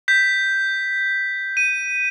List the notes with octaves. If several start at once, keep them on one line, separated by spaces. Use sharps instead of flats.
G6 B6
D#7